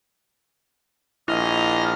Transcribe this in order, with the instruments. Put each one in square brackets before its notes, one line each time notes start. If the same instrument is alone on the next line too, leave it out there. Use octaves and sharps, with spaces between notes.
[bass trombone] A#1 [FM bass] E4 [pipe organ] D#5 F6